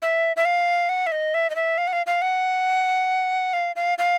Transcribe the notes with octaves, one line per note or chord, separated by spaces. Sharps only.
E5
E5
F5
F#5
E5
D#5
E5
D#5
E5
F5
F#5
F5
F5
F#5
F5
F5
F5